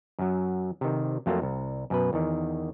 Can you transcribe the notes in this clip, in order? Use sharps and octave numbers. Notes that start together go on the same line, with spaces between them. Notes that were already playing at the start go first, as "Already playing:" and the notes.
F#2 F#3
C3 D#3
F2 F#3 A3 A#3 F4
C2
F#2 B2 B4
E2 D#3